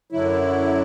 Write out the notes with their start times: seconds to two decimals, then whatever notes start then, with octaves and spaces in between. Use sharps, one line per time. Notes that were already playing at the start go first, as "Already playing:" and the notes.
0.12 F#2 D3 F#3 E4